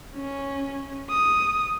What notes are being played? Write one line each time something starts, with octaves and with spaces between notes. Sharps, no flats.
C#4
D#6